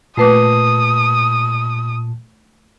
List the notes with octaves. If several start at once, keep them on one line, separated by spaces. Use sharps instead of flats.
A#2 A3 B4 A5 D6 D#6 C7